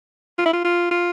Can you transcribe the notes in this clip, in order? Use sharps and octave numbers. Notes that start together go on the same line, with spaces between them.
F4
E4
F4
F4
F4